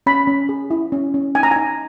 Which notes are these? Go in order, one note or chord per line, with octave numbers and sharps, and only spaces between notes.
C#4 B5
C#4
G#4
E4
C#4
C#4
D#4 G#5
A#5
D#4 G#5